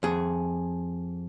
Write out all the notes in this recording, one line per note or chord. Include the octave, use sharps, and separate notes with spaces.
F2 G#4